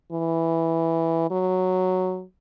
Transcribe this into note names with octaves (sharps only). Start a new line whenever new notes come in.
E3
F#3